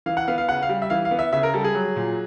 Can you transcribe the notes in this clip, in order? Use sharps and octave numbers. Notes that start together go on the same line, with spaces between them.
E3 F5
F#5
B3 F5
F5
C#3 F#5
F5
G3
E5
E3 F5
F5
B3
E5
C#3 E5
A#4
G3 A4
G#4
F#3
A#2